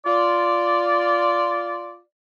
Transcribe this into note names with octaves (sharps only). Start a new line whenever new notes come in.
F4 D5